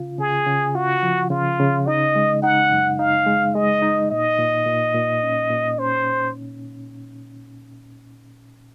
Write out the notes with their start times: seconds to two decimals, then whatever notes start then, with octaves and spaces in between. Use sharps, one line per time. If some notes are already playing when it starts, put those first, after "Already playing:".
Already playing: C#3 F4
0.19 C#3 G#4
0.46 C#3
0.75 F4 F#4
1.03 F3
1.30 C#3 F4
1.59 C#3
1.87 D#4 D#5
2.16 G#3
2.42 D#4 F#5
2.71 F#2
2.98 D#4 F5
3.26 G#3
3.54 G#3 D#5
3.82 D#4
4.11 A#2 D#5
4.38 A#2
4.66 A#2
4.94 A#2
5.23 C#4
5.50 A#2
5.78 C#4 C5